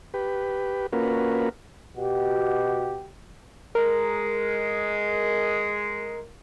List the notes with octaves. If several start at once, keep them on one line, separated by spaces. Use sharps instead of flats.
G4 B4
A#3 C#4 F4 F#4 A#4 B4
B2 F#4 G4
G#3 A#4